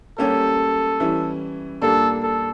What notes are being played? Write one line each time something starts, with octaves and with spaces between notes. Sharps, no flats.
G3 A#3 C#4 G4 A4 C#5
E3 G3 C#4 E4
A#2 G3 A#3 D4 A4
A4